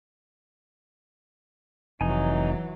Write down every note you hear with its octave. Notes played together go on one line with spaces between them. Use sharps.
F1 E3 F#3 D#4 G#5